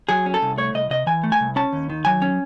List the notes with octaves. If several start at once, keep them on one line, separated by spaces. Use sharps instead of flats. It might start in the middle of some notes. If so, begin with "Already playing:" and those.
F#3 G#4
C#4
A4
C2
A3 C#5
C2 D#5
C3 D#5
E3 G#5
A3
G#5
C2
C#4 A5
D#2
D#3
F#3 G#5
C#4